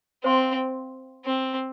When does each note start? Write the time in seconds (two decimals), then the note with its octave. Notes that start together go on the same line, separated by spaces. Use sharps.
0.24 C4 C5 F5 C6
1.25 C4